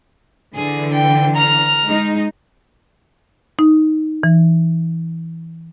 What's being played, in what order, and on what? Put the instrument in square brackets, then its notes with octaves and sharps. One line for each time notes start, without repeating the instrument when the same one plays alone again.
[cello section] D3 E3 [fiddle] G#4
[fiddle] G5
A#5 F6
[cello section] G#3 D#4
[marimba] D#4
E3